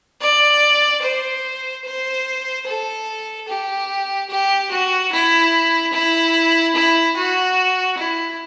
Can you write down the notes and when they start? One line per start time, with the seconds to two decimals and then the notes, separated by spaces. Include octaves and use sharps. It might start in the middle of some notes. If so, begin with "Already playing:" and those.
0.21 D5
1.02 C5
1.85 C5
2.66 A4
3.48 G4
4.29 G4
4.71 F#4
5.12 E4
5.93 E4
6.75 E4
7.16 F#4
7.98 E4